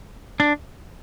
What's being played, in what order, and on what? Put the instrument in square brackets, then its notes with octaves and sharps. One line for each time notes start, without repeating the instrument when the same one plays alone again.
[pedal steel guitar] D4